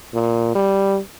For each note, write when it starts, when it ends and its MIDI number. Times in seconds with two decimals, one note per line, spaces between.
0.14 0.53 46
0.55 0.99 55